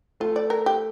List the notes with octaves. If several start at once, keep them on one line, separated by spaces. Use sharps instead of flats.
A3 F4
D5
A#4
G4